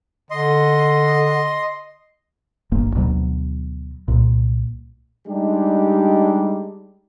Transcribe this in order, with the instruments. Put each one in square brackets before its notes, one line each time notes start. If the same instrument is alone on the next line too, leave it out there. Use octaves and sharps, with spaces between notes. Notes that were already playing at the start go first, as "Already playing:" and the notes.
[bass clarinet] D3 [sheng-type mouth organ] D#5 C6
[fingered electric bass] G1 A#3
D2 B2 F#3
C2 A#2
[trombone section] G3 G#3 D4 D#4 G4